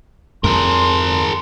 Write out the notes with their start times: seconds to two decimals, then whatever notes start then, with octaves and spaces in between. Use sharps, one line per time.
0.44 F2 G#4 A#4 C6